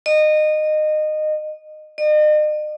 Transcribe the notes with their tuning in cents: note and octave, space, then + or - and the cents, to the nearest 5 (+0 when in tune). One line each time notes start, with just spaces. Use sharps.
D#5 -20
D#5 -40